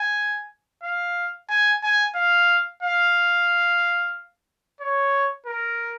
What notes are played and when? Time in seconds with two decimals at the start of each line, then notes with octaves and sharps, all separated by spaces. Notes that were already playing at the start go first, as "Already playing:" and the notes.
Already playing: G#5
0.84 F5
1.50 G#5
1.83 G#5
2.15 F5
2.83 F5
4.81 C#5
5.46 A#4